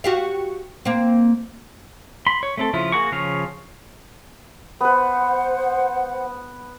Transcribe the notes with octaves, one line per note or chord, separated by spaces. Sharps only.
F#4 G4 F5
A#3 C4
B5 C6
C#5
A3 C4 A4
C#3 F3 E4 F4
A#3 F#4 G#4 C#6
C#3 F3 G#4 C#5 F5
B3 B4 C5 F#5